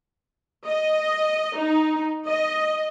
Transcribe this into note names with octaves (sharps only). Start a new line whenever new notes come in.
D#5
D#4
D#5